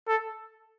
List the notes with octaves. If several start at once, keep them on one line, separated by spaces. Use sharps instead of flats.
A4